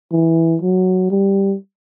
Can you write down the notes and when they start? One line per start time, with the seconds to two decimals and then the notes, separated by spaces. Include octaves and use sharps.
0.12 E3
0.62 F#3
1.11 G3